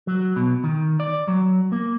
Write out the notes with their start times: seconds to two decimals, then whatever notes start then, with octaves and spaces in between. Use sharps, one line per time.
0.07 F#3
0.36 B2
0.64 D#3
1.00 D5
1.28 F#3
1.72 A#3